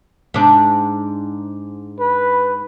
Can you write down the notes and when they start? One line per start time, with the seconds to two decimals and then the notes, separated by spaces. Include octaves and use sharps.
0.34 G#2 D4
2.00 B4